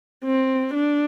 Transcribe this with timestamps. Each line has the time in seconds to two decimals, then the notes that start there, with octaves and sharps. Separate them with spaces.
0.24 C4
0.74 D4